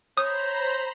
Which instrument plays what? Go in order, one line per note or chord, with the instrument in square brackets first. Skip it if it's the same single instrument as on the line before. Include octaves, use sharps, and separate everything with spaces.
[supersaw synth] C5 A#5 B5 [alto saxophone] C#5 [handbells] D#6 [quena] G6